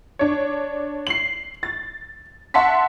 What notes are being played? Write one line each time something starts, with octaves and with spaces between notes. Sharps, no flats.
D4 C#5
C7 F#7
A6
E5 F#5 A5 C6 B6